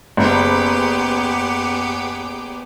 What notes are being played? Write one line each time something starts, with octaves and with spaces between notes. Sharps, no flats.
F#1 B3 G4 G#4